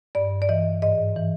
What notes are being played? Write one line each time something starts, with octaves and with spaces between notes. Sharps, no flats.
G2 D5
D5
E3 D#5
G#2 D#5
E3